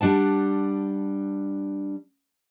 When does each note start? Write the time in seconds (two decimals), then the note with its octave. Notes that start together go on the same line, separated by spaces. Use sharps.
0.01 G3 D4 F#5 A5